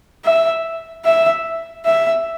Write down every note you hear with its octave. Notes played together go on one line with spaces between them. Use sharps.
E5
E5
E5